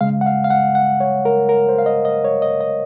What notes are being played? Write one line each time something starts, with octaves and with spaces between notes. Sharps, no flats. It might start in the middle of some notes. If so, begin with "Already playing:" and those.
C#3 G#3 F5
F#5
F5
F5
F#5
F#5
C#5
A#4
A#4
C5
F5
D#5
D#5
C#5
D#5
D#5